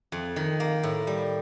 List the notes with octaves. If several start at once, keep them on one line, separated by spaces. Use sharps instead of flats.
F2
D#3
A#3
A2
G3